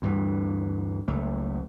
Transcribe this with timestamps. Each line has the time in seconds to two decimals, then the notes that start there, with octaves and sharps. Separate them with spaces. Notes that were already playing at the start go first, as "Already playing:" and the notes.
0.02 D2 G2 E3
1.08 F#1 C#2 A3